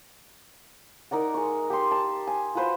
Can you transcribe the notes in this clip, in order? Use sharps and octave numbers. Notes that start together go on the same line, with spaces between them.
D#4 A#4 D5 F#5
G#3 C#6
G4 C6
A5
G#5
F4 F#4 B4 C5